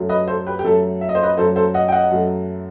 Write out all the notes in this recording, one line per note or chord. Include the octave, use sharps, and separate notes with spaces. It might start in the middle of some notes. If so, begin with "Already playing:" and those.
Already playing: F#2 F#3 A3
B4 D#5
A4 C5
G4 B4
G4
F#2 F#3 A3 A4
E5
D#5
C5
B4 D#5
F#2 F#3 A3 A4 C5
A4 C5
D#5 F#5
G5
D#5 F#5
F#2 F#3 A3